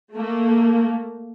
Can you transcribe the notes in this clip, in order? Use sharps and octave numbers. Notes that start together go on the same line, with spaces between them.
A3 A#3